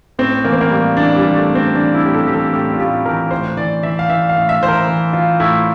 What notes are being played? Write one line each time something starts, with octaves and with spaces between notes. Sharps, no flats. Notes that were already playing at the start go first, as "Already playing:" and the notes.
A2 C4
E3 A#3
C4
A#3
A2 G3
E3 D4
G3
E3
A3
A2
C4
E3 D4
E4
A2 G4
A4
E3 G4
A4
A2 G4
F4
A2 G4
E3 A#4
A2 C5
E3 D5
E3 E5
F5
E3 E5
F5
A2
E5
E3 C5
A#4
E3
E3 F4
A2 E4